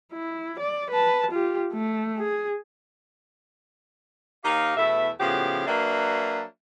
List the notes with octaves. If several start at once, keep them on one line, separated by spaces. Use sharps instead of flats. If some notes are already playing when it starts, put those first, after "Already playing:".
E4
D5
B4 A5
F4 G4
A3
G#4
D#2 D#4 G4 A#4 F5
E2 B2 A3 E4 E5
A2 C#3 F3 B3 F#4 G4
F#3 A#3 D4 F#4 B4 E5